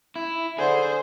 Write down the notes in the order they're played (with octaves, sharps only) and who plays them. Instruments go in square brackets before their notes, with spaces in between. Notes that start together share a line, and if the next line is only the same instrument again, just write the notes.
[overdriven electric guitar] E4
[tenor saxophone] D3 [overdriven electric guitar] G#4 [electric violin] C5